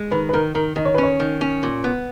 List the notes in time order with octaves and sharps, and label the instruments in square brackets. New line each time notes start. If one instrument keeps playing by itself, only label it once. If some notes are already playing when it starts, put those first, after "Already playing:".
Already playing: [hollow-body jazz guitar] G#3
[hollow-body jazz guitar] D#3 [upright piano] B4
[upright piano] B4
[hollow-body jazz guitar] D#3 [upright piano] A#4
[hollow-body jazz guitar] D#3 [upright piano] A#4
[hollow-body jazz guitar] D#3 [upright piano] D#5
[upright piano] C#5
[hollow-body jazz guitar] C#4 [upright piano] B4
[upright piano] C#5
[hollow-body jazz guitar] D#3
C#4
A#2
B3